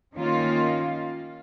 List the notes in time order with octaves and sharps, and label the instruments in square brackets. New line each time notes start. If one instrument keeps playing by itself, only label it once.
[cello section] D#3 A#3 C#4 F4